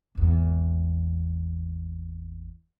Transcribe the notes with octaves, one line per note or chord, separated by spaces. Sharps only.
G#1 E2